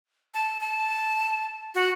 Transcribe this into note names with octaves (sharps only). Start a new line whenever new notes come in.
A5
A5
F#4